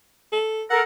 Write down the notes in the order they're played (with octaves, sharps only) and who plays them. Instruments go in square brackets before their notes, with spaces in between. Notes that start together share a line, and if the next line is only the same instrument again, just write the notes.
[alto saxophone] A4
[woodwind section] A4 A#4 [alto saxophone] F#5